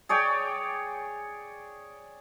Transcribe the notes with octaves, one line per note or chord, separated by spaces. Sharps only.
G#4 C#5 D5 G5